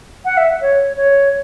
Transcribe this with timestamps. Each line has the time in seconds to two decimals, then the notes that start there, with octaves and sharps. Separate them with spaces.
0.25 F#5
0.37 E5
0.61 C#5
0.96 C#5